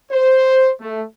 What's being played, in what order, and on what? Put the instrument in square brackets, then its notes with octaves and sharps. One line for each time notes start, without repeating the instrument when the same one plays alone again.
[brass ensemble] C5
A3